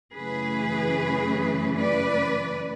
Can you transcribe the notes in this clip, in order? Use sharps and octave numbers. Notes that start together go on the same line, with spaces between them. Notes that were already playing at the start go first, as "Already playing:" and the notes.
F#2 C#3 E3 A3 C#4 G#4 B4
B4 D5